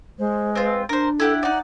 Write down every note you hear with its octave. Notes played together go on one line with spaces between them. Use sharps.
G#3 C5
C4 F4 B4
D4 A#4 C5
E4 G4 A4 F#5
D#4 D5 F#5